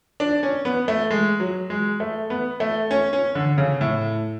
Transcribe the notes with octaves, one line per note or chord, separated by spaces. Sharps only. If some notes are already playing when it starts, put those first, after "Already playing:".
D4
C#4
B3
A3
G#3
F#3
G#3
A3
B3
A3
C#4
C#4
D3
C#3
A2